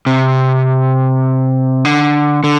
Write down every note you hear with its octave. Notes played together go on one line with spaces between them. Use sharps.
C3
D3
D3